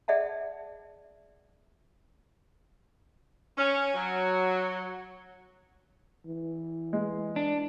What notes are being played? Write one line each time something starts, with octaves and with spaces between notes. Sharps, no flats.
G#4 D5 E5 F#5 A5
C#4
F#3
E3
G#3
D4